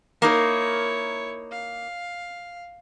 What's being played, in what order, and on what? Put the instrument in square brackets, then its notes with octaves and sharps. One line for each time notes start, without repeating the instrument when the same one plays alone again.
[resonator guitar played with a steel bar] A#3 D#4 A#4 [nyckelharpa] E4 C#5
[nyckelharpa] F5